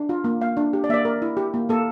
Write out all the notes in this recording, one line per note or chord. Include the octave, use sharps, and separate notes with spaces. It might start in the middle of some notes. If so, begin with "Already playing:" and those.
Already playing: D4
F4
A#3
A#3 F5
D4
G4
D5
A#3 D5 E5
A#3 A#4
E4
G4
A#3
A#3 A4